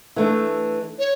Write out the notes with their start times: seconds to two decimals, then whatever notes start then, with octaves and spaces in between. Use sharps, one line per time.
0.16 E3 A3 D4
0.99 C#5